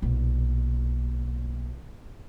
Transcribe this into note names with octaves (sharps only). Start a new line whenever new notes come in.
B1 A#2